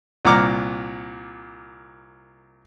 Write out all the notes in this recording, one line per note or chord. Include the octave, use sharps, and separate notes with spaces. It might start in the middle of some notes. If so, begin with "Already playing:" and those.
C2 A#2 F#5 A#5 D6 F6